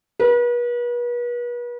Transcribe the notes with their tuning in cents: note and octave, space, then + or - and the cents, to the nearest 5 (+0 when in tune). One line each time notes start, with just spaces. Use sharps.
B4 -40